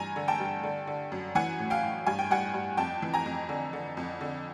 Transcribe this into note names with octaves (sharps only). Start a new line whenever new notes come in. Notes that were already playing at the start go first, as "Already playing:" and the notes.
Already playing: G2 E3 G#5 A#5
D3
G5 A5
G2
D3
D3
F#2
E3 F#5 G#5
A2
F5 G5
A2
G2 G#5
G5
G2 F#5 G#5
G2
F2 G5 A5
E3
G#5 A#5
F2
D3
D3
F2
D3